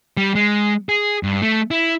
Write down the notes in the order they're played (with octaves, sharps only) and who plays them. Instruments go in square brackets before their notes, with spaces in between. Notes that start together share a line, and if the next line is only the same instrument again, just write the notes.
[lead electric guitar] G3
G#3
G#4
G2
A3
E4